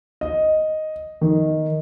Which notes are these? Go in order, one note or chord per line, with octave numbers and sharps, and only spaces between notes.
D#5
D#3